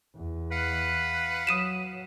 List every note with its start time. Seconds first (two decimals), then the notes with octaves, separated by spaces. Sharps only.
0.16 E2
0.51 B4 F5 F#5
1.47 F#3 D#6 D#7 E7